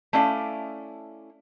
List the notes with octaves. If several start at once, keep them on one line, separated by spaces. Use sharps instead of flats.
A3 C#4 E4 D5 F5